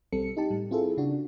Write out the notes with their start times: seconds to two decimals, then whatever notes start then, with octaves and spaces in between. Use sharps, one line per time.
0.12 B1 G3 C4 A4 C#7
0.37 D#4 G4 A5
0.50 A2 G3
0.71 C4 E4 F4 G#4 A4
0.97 C#3 D4 F#4